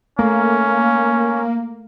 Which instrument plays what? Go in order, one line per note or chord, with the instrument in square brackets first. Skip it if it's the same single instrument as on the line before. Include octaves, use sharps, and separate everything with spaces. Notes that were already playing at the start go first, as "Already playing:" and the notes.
[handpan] A3 [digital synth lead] A#3 [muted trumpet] C#4